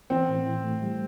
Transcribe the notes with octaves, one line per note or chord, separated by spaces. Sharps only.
E3 C4
A2
E4
A3
G3